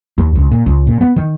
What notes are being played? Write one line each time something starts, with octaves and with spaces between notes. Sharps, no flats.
D#2
C#2
A#2
C#2
A#2
B3
D#3